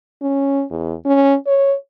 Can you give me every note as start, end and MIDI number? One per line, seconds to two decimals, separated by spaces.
0.22 0.63 61
0.71 0.95 40
1.06 1.35 61
1.47 1.75 73